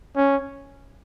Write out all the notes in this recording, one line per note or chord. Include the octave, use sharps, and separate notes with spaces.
C#4